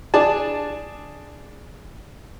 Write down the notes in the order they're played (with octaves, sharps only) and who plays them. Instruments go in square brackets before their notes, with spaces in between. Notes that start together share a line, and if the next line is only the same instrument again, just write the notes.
[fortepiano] D4 G#4 D5 A5